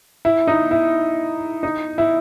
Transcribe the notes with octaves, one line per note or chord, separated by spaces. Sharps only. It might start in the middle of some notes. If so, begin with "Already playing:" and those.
E4
D#4
E4
D#4
E4